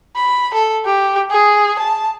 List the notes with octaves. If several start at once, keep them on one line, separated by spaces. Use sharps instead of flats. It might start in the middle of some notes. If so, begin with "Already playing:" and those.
B5
A4
G4
G#4
A5